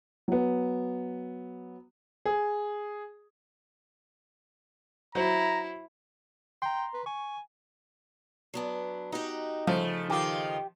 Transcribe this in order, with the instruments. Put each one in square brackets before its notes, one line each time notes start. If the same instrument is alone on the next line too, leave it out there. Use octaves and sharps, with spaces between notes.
[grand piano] F#3 B3
G#4
[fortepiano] F#3 C5 [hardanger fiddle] E4 [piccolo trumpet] A#5
[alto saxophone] G5 [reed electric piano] A#5 C6
[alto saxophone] B4
[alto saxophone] G#5 [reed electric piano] C#6
[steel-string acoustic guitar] F#3 B3 D4
[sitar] D#4 [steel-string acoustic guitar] F#4 G4
[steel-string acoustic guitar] C#3 [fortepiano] F3 [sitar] A3
[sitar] D#3 F4 [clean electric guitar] G4